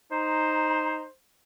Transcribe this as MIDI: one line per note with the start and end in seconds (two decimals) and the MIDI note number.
0.12 1.07 63
0.12 1.12 72
0.12 1.00 82